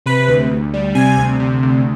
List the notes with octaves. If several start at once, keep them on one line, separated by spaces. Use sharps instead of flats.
C3 B4
D2
D2
G3
C3 G#5
D2
C3
D2